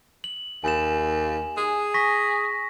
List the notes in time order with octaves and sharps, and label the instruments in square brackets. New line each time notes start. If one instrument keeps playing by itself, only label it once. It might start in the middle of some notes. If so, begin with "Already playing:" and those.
[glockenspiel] F#7
[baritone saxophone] D#2 [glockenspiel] G#5 E7
[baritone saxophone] G#4
[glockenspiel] C#6 A#6 B6